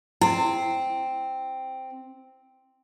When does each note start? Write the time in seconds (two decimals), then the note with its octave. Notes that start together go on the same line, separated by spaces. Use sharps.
0.21 C4 E4